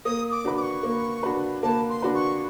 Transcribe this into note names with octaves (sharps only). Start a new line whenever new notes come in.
A#3 D#6
D6
D4 F#4 B4
D6
C#6
A#3
D4 F#4 B4
A#3 A5
C6
D4 F#4 B4
C#6